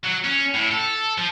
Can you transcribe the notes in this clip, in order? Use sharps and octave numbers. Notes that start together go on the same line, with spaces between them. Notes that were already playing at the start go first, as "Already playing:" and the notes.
F#3
C#4
A2
A4
F3